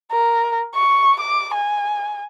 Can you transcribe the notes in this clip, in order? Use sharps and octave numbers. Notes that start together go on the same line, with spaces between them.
A#4
C#6
D6
G#5